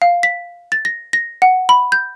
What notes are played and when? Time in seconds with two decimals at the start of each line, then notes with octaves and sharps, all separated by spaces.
0.02 F5
0.23 B6
0.72 A6
0.85 A#6
1.13 A#6
1.42 F#5
1.69 B5
1.92 G6